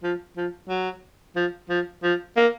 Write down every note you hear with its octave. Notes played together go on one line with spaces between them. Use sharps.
F3
F3
F#3
F3
F3
F3
A#3